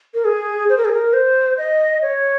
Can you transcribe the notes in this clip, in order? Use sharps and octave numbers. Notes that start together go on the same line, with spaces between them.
A#4
G#4
C5
A#4
G#4
A#4
C5
D#5
C#5